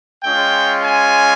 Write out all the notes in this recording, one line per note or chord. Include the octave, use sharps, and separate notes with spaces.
G#3 C#4 F4 G5
G#5